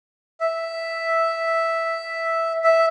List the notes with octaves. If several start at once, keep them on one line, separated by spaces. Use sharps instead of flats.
E5
E5